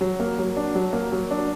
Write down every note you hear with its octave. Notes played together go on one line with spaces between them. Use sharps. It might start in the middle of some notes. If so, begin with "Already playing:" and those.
F#3
A#3
F#3
D4
F#3
A#3
F#3
D4